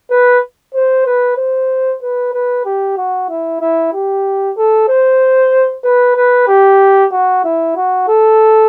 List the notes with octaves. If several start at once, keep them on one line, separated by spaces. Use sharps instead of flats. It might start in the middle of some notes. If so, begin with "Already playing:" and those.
B4
C5
B4
C5
B4
B4
G4
F#4
E4
E4
G4
A4
C5
B4
B4
G4
F#4
E4
F#4
A4